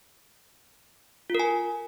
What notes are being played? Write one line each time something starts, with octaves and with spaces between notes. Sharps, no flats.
F4 A#4 G#5